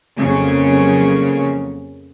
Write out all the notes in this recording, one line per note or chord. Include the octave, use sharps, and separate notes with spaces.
F2 C#3 F#3 A#3 C#5